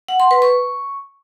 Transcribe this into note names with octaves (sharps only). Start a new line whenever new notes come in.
F#5
C6
B4
C#6